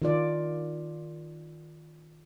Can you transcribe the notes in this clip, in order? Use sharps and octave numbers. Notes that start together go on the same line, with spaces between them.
D#3 F4 D5